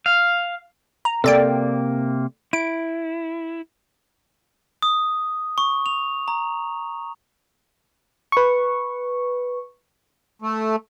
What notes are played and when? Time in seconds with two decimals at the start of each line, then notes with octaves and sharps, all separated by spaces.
0.06 F5
1.05 A#5
1.24 C3 A#3 A4 D5 G5
2.53 E4 D7
4.82 D#6
5.58 C#6
5.86 F7
6.28 A#5
8.32 B4 C#6
10.42 A3